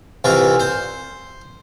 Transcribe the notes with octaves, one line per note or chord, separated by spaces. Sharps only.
C2 E3 F4
C5